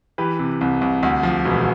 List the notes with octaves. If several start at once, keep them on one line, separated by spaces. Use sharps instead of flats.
E3 G4 B4
C3
C2
C2
D2
F3
E1